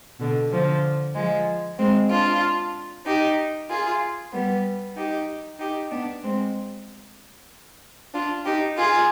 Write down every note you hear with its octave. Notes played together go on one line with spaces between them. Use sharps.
B2 D3
D3 F3
F3 G#3
G#3 C4
D4 F4
D#4 G4
F4 G#4
G3 B3
D#4 G4
D#4 G4
B3 D4
G#3 C4
D4 F4
D#4 G4
F4 G#4